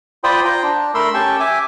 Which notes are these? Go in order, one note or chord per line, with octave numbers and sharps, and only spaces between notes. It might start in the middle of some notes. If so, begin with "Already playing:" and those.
F4 C5 D5 G5 B5 D#6
F4 C5 G5 A#5
D4
A3 A#4 B5 C6 E6
C#4 G4 G5 A5 C#6
E5 G#5 D6